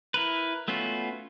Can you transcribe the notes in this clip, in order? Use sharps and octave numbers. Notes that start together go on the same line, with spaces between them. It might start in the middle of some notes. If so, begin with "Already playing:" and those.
E4 A#4 B4
A3 B3 C#4 F4 F#4